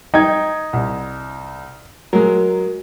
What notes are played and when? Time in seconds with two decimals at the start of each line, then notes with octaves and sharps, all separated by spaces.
0.14 D#4 G5 G#6
0.73 C2
2.13 F#3 G#3 A#4